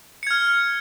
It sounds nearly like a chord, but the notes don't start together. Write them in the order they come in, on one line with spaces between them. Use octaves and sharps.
C#7 G#6 F6